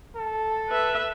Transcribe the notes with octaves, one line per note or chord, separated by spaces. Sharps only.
A4
B4 E5